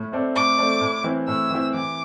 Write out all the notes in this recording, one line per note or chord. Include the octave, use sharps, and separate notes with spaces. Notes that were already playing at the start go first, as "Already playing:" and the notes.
Already playing: A2
A3 C4 A4 D5
A2 D6
A3 C4 A4 D5
A2
E3 C4 E4
A2 E6
E3 C4 E4
E3 D6